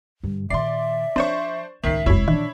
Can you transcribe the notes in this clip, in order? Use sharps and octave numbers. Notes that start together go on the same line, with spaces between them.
G2 D3
A#2 D#3 D5 E5 C6 C7
F3 C4 D4 C5 C#5 C#6
C#2 A2 D#3 E5 B6 C7
F1 B1 F#2 G#3 E4 C#5
A#2 D#3 E3 D4 D#4